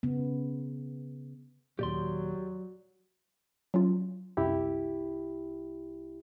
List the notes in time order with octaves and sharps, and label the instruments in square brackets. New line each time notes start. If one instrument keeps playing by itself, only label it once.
[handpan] C#3 B3
[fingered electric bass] D#2 A#2 [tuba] F#3 [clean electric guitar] G4 D5 C6
[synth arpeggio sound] F#3 C#4 F4
[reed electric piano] C2 E4 G4 [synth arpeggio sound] F#2